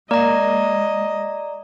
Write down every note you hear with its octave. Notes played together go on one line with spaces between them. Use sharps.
G#3 A#3 D5 D#5 A#5